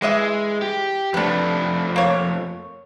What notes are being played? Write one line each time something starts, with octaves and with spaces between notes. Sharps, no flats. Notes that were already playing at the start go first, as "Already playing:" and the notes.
E3 G#3 D#5 E5
G4
F2 A3 D4 B4
A#3 C#5